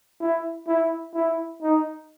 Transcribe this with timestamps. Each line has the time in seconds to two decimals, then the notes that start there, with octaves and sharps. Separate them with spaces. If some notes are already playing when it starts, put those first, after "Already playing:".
0.20 E4
0.67 E4
1.14 E4
1.62 D#4